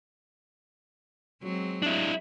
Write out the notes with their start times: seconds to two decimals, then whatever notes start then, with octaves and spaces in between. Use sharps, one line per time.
1.43 F#3 G#3 C4
1.82 D4 E4